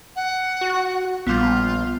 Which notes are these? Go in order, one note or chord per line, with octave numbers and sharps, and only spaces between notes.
F#5
F#4
A#1 G3 B3 F4